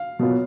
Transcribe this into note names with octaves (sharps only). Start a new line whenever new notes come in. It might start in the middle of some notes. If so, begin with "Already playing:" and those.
Already playing: F5
B2 F#3 B3 F4